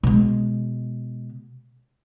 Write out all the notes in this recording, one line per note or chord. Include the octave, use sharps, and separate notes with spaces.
B2 G#3